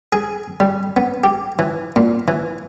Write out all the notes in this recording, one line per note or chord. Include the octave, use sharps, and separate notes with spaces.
G#4
G3
B3
G4
E3
A#2
E3